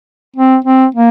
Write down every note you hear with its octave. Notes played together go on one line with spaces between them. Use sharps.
C4
C4
A#3